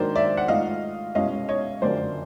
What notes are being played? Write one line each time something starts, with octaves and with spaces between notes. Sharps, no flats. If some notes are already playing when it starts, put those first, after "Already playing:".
Already playing: G#2 D#3 F#3 A#3 D4 C5 D5
D5 E5
F#5
G#2 F3 A3 D#5 F5
C2 B2 G#3 C#4 E4 D#5 F5
C#5 D#5
F#1 F2 D3 F#3 A#3 C5 D5